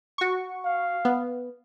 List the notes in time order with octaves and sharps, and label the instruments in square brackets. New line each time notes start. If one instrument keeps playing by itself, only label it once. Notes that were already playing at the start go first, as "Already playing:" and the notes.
[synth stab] F#4 C#6
[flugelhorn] F5
[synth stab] B3